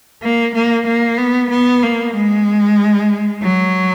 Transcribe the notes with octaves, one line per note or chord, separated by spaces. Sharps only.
A#3
A#3
A#3
B3
B3
A#3
G#3
F#3